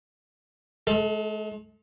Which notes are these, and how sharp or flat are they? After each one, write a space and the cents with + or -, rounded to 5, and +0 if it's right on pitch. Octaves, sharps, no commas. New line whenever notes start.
G#3 +45 A4 +0